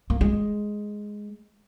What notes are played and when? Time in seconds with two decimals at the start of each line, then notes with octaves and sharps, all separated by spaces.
0.10 A#3
0.21 G#3